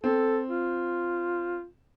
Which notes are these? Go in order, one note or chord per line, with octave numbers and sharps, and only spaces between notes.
C4 A4
F4